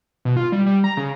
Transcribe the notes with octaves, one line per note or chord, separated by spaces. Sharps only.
B2
F4
G3
G3
A#5
C#3